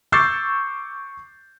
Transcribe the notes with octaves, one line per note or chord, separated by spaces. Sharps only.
C#6 D6 E6 G6 A6 C7